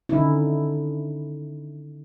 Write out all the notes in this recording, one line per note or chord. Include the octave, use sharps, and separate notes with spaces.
D3 D#3 C#4 D#4 E4